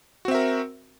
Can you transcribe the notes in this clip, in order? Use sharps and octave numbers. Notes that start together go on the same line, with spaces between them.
C4 F#4 A#4 E5